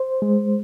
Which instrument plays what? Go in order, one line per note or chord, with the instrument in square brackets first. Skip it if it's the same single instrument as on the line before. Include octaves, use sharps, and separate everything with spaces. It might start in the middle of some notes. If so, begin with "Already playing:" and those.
Already playing: [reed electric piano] C5
G#3